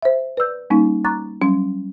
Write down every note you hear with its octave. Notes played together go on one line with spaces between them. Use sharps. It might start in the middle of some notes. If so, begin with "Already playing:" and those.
C5 E5
B4 D5 E6 G6
G3 A#3 C#4 D#4
A#5 C#6 D6 F#6 A6
F#3 G3 C#4